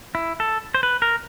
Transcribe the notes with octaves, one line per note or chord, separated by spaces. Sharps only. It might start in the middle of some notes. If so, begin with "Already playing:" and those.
E4
A4
C5
B4
A#4